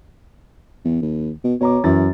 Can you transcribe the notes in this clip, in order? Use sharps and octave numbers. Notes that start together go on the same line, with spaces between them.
E2
D#2
B2
B2 C#5 A#5 D6
F#2 E3 F#3 A6